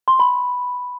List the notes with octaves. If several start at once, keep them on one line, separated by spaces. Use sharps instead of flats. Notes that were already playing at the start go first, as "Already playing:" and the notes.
C6
B5